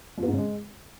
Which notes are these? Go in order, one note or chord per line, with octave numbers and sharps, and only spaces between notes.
F2
B3
G#2
C#3
G#3